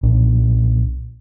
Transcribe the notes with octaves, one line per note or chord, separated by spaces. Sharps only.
B1 A#2 D4